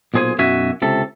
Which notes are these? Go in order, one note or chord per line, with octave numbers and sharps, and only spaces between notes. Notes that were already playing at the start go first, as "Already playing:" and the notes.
B1 A#2 G#4 C5 G#5
B1 F#2 F#4 E5 G#5
C#2 C3 A4